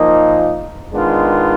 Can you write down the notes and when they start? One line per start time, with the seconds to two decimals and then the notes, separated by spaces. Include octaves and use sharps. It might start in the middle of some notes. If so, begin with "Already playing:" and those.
Already playing: A#2 F3 A#3 D#4
0.92 D#3 G#3 B3 D4 F4